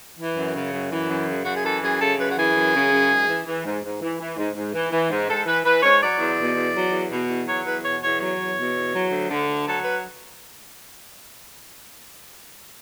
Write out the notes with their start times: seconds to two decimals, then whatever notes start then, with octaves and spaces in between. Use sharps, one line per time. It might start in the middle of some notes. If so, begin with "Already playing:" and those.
0.18 E3
0.36 F#2
0.54 C#3
0.72 F#2
0.91 E3
1.09 F#2
1.27 C#3
1.44 F#2 F#4
1.54 G#4
1.64 E3 A4
1.82 F#2 G#4
2.00 C#3 A4
2.18 F#2 B4
2.29 F#4
2.36 E3 G#4
2.55 F#2
2.73 C#3
2.92 F#2
3.09 G#2
3.28 E3
3.46 E3
3.64 G#2
3.83 G#2
4.01 E3
4.19 E3
4.37 G#2
4.55 G#2
4.73 E3
4.91 E3
5.10 G#2
5.28 G#2 A4
5.46 E3 B4
5.64 E3 B4
5.82 G#2 C#5
6.01 F#3 D5
6.19 E2
6.37 B2
6.55 E2
6.74 F#3
6.91 E2
7.10 B2
7.28 E2
7.46 F#3 C#5
7.64 E2 B4
7.83 B2 C#5
8.01 E2 C#5
8.19 F#3 C#5
8.38 E2
8.56 B2
8.74 E2
8.93 F#3
9.10 D2
9.29 D3
9.47 D2
9.65 F#3 A4
9.83 B4